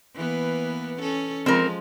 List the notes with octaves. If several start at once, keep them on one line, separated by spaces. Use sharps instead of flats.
E3 A#3 B3
C#4 A4
F3 G#3 C4 A#4